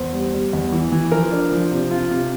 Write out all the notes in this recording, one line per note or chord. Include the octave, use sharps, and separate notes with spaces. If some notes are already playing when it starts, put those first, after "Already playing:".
Already playing: E2 C5
G3
G3
E2
E3
E3
F3 A#4
D4
F3
C3
F4
C3